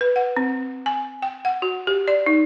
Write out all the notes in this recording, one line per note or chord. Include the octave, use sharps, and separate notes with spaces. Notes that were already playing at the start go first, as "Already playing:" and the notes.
B4
F#5
C4
G#5
G5
F#5
F#4
G4
D5
D#4